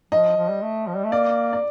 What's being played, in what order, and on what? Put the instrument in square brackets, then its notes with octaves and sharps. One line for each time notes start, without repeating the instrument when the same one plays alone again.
[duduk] F3 [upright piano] D#5
[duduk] F3
G3
A3
F3
G3
A3
[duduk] A#3 [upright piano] D5
[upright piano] D5